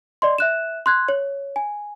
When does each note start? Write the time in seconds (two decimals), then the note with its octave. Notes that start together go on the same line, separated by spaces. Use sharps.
0.22 D5 D#5 C6
0.38 E5 F#6 E7
0.86 C6 F#6 G#6
1.09 C#5
1.56 G#5